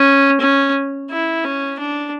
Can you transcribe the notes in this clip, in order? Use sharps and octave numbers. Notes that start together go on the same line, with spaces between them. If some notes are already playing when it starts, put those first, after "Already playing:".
Already playing: C#4
C#4
E4
C#4
D4